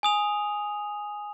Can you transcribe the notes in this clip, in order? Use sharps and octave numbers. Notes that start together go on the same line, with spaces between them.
G#5 D#6 F7